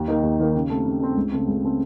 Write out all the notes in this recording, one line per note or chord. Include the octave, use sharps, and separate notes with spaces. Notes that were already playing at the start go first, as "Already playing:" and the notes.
Already playing: D#2
D#3 A#3 D#4
D#2
D#3 A#3 D#4
C#3
A3 C4
C#3
A3 C4
C#2
C#3 A3 C4
C#2
C#3 A3 C4